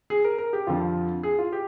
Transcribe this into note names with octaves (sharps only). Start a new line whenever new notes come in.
G#4
A#4
A#4
G4
F2 D3 F3 F4
G#4
F4
G4